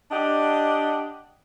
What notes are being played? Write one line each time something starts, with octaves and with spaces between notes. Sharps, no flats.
D4 G4 D#5 F#5